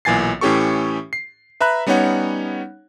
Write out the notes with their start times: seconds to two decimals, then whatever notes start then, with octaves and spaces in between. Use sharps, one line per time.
0.05 B1 A#2 E3 G#5 A6 C7
0.41 A2 E3 C#4 G4 A4 C#6
1.13 C7
1.60 B4 E5 A#5 B5 F#6
1.87 G3 B3 C#4 D#4 C#5 F#5